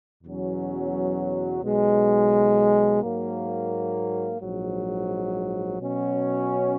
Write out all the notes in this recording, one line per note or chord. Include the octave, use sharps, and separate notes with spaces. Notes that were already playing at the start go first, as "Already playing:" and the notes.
E2 B2 F#3 C#4
B1 B2 G#3
G#2 F#3 A#3
A#1 G#2 F#3
B2 F#3 C#4